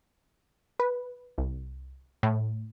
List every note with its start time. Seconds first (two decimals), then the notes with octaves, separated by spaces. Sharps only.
0.80 B4
1.38 C2
2.23 A2